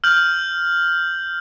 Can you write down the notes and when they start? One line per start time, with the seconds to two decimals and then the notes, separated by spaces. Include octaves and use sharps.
0.04 F6 G6 F#7